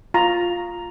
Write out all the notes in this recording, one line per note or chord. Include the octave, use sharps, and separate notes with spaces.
F4 A#5